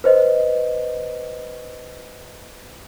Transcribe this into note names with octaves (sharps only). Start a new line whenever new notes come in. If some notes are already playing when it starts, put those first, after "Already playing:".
B4 C5 D#5